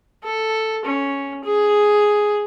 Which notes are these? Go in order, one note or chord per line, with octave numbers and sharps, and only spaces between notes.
A4
C#4
G#4